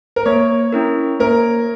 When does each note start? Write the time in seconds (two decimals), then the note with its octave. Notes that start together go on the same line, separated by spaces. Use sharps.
0.16 A#4
0.26 A#3 C#5
0.73 C#4 E4 A#4
1.20 A#3 A#4